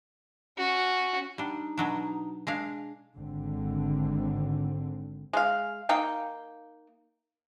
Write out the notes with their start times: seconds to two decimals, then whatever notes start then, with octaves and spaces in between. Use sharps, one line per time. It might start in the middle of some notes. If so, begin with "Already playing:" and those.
0.58 C#4 F#4
1.38 G3 D4 D#4
1.77 B2 F#3 D4
2.47 G#3 D4 F5
3.16 G#1 D3 C4
5.33 G#3 F5
5.89 A#3 D#4 F5 G5